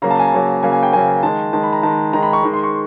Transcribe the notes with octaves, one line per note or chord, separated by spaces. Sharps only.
C#3 F#3 A#3 A#5
A5
G#5
A5
C#3 F#3 A#3
C#3 F#3 A#3 G#5
G#5
G5
C#3 F#3 A#3 G#5
D#3 G#3 A5
D#3 G#3 A5
B5
A#5
D#3 G#3 A5
D#3 G#3 A#5
B5
C#6
D#3 G#3
C6
C#6